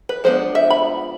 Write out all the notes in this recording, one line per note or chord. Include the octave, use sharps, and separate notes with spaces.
B4
F3 G#3 B3 D4 C5
E5
B5